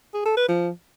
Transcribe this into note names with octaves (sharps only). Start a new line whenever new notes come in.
G#4
A4
B4
F3